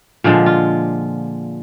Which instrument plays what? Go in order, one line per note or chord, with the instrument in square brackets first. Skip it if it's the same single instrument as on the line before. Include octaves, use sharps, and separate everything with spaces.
[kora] A#2 D3 F3 G#3
F4